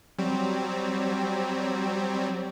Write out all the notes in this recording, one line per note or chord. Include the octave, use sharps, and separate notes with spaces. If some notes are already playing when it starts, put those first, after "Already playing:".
F#3 G3 C4